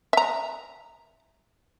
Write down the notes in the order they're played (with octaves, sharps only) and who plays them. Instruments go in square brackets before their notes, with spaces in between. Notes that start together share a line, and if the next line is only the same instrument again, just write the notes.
[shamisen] E5 A#5